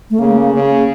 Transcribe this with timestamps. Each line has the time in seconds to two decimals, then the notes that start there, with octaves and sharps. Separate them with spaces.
0.10 A3
0.19 C#3 A#3
0.54 C#3